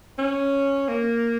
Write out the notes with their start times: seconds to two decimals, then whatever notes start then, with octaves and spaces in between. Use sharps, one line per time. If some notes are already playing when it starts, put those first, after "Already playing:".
0.18 C#4
0.88 A#3